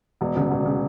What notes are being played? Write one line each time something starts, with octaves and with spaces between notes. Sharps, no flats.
E1
D2 C#3
E1
C#3